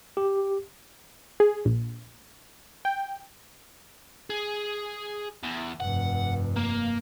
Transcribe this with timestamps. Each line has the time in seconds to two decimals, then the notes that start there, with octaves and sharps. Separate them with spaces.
0.17 G4
1.40 G#4
1.65 A#1
2.85 G5
4.30 G#4
5.44 E2
5.80 F1 G2 F#5
6.56 A#3